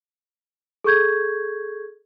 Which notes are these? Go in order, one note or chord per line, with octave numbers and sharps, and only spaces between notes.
G#4 A4 C#6 G6 G#6